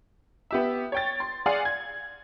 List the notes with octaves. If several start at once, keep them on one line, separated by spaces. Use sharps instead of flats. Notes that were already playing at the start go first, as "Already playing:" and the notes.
B3 G4 E5
C#5 G5 A6
C6
G#4 D5 F5 F#5 G#5 C6
G#6